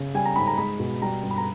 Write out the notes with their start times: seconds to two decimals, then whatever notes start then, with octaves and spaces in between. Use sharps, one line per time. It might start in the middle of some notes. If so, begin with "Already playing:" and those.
Already playing: C#3
0.14 G3 G#5
0.25 A#5
0.36 G#2 B5
0.47 A#5
0.58 G#3 B5
0.80 B2
1.02 G3 A#5
1.23 G2
1.31 B5
1.38 A#5